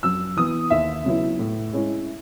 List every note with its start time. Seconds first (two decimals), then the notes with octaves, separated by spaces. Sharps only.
0.03 F#2 E6
0.37 E3 B3 D#6
0.70 D#2 E5
1.04 C#3 F#3 B3 E4
1.39 A2
1.73 G#3 C#4 E4